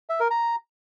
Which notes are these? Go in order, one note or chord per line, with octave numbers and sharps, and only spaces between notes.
E5
A#4
A#5